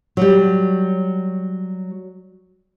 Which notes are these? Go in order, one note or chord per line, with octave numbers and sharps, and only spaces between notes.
F#3 G3